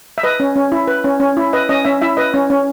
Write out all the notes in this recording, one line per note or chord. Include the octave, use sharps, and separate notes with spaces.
E5
B4 D#5
C#4
C#4
E4
B4
C#4
C#4
E4
B4 D#5
C#4 D#5
C#4 E5
E4 E5
B4 D#5
C#4
C#4